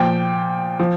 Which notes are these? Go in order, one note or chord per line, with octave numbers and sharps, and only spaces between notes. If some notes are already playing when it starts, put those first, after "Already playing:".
Already playing: A#2 F3 G5
F3